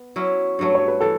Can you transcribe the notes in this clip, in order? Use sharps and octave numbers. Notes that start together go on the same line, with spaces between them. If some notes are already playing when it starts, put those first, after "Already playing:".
Already playing: B3
F#3 C#4 E4
G2 F#3 A3
C#5
B4
E3 A4